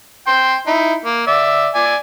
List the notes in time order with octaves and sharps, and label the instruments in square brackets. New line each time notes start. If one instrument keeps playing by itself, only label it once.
[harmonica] G5 C6
D#4 E4
A#3
D5 E5
D5 G#5